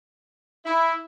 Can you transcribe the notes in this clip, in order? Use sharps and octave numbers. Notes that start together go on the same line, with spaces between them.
E4